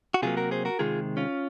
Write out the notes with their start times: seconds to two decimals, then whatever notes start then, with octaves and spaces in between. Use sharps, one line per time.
0.14 F#4
0.22 C3 F#3 A#3 F4 G#4
0.37 F#4 A#4
0.51 G#4 C5
0.65 F#4 A#4
0.79 C3 D#3 G#3 F4 G#4
1.17 C#4 F4